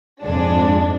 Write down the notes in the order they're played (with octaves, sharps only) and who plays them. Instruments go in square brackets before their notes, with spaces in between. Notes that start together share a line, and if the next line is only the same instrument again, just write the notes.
[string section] F2 G#2 G#3 D4